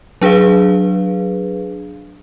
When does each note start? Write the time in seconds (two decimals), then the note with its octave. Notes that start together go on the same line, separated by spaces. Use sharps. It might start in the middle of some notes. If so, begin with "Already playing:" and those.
0.21 F#3 D4 G#4 B4 F5